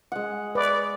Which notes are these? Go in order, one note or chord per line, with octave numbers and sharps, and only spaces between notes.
G#3 F#5
B4 D5